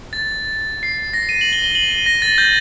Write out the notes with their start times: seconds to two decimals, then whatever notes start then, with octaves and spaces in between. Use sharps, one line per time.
0.13 A6
0.83 C7
1.14 A#6
1.29 D#7
1.41 F#7
1.53 G7
1.64 G7
1.75 F#7
1.91 D#7
2.06 A#6
2.22 A6
2.38 G6